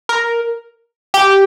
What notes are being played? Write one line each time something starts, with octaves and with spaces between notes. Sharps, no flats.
A#4
G4